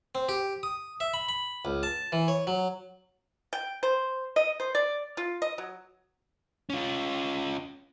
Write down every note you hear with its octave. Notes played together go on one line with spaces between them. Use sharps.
C4
G4
D#6
E5
B5
B5
C#2
A5
E3
C#5
F#3
G5
C5
D#5
C5
D5
F4
D#5
F#3
C#4 F4